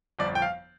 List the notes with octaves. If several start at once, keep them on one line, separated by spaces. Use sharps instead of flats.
G1 F2 F3 D5
G5
F5